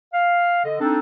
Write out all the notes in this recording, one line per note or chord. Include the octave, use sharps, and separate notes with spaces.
F5
D3 D#5
C4 D4 D#4 A4